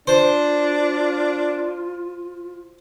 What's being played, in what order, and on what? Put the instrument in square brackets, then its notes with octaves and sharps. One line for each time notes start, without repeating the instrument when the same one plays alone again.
[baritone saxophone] D4 [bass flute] F4 [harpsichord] C5